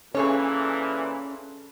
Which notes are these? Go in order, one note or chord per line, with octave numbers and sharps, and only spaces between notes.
A#2 E3 C#4 G#4 A4 C#5